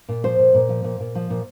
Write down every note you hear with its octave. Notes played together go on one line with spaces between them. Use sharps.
A#2
F3 C5
A#2
A#2
F3
A#2
A#2
F3
A#2